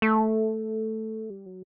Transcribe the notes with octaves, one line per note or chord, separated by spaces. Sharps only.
A3
G3
F#3